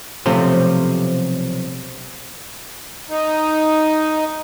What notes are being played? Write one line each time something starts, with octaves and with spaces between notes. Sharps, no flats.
B1 C3 F3 A3 C#4 C5
D#4